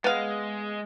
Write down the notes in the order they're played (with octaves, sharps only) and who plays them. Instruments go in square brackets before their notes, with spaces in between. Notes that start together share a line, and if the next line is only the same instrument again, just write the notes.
[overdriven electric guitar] G#3 [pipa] B3 F5